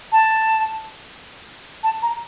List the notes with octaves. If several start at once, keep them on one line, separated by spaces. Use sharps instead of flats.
A5
A5
A#5